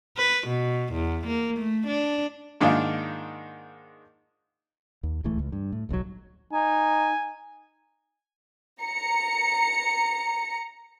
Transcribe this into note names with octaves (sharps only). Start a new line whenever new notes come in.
B4
B2
E2
A#3
A3
D4
G#2 D#3 A#3 D4 F4
D#2
D1 C#2 E3 A3
C#2
G2
A2
D1 B1 B2 F#3
D#4 G#5
A#5 C#7